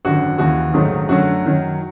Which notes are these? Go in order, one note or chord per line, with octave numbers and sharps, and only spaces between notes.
G#1 F#2 D3 F#4
D#2 C#3 E3 F#4
A#1 G#2 D#3 F#3 A3
F#2 D3 F#3 A3 F#4
F#2 D#3 F#3